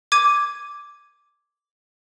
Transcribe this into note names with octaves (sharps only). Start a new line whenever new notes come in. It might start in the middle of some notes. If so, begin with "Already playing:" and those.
D6 G#6 D#7